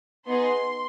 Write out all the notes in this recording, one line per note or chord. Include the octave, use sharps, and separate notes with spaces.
B3 D#4 G#4 C6